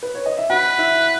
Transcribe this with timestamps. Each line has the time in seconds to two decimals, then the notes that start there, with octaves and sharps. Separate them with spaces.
0.03 B4
0.15 C#5
0.26 D#5
0.37 E5
0.50 F#4 B4 F#5
0.78 E4 E5